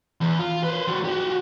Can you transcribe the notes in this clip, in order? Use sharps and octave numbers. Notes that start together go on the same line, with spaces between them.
E2
F4
B4 C5
G3 F#4
F#4 G4